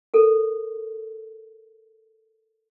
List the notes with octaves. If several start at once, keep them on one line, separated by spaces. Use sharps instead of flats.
A4 A#4